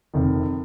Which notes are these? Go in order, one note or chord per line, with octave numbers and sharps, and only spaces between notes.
F1 F2 D#3